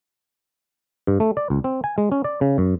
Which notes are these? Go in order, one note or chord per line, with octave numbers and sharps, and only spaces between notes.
G2
A3
D5
C#2
C4
G#5
G#3
C#4
D5
C#3
F#2